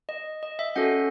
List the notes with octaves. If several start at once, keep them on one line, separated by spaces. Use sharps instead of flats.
D#5
D#5
E5
C#4 F#4 A4 F#5